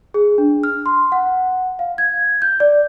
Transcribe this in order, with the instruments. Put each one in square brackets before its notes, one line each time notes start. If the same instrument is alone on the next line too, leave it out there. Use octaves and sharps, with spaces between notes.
[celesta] G#4
D4
F6
C6
F#5
F5
G#6
G6
D5